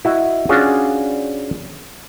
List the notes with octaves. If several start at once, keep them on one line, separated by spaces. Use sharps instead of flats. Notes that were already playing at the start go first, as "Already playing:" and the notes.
E4 F#4 D#5
C#4 D4 F4 F#4 G#4